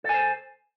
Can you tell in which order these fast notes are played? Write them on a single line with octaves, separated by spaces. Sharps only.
A4 G#5 C5